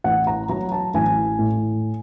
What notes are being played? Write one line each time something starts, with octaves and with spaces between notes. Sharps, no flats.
A1 F#5
A#5
F#3 A#5
A5
A1 G#5
A2